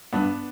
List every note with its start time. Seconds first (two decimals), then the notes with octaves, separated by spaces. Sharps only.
0.13 G2 B3 D4